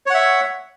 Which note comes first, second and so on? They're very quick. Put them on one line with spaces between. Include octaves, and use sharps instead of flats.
C#5 F#5 E5